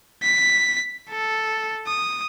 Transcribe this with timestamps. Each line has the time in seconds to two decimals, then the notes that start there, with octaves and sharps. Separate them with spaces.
0.23 B6
1.10 A4
1.87 D#6